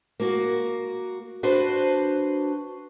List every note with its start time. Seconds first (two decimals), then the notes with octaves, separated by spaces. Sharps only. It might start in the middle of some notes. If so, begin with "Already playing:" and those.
0.20 A#3 F#4
1.43 D4 F#4 B4 C5